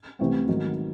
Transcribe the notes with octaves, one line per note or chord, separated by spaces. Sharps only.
C2 C3 E3 A3 C4
G#2 D#3 F#3